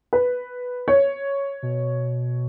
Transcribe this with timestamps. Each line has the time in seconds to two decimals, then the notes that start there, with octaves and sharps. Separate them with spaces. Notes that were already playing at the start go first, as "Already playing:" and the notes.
0.13 B4
0.88 C#5
1.63 B2